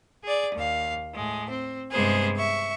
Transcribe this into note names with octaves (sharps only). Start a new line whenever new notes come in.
G#4 D5
D#2 F5
A2 G#3
C4
G2 C3 G#3 B3 G#4 C5
E5 C#6